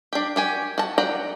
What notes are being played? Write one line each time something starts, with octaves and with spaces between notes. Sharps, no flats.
D4 G4
F#4 G4 G#5
F#4 A5
F#3 D5 F#5 G5 A#5